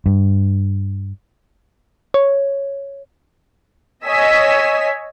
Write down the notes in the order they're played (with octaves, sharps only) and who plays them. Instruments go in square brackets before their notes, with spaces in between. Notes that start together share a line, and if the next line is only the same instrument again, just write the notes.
[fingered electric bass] G2
[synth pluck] C#5
[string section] C#5 D#5 G#5 E6 B6